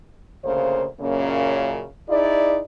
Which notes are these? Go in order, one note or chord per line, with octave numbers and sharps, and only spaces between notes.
D2 C#3 A#3 C5
F#2 A#2 C#3 A#3 C#4
D#4 E4 G#4 D5